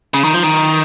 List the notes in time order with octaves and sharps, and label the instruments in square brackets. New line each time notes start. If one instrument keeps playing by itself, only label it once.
[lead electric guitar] C#3
D#3
F3
D#3